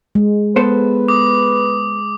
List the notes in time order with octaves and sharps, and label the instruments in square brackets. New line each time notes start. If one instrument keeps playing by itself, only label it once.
[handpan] G#3
[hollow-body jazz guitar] B3 A4 C5 [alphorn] B4
[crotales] D6 D#6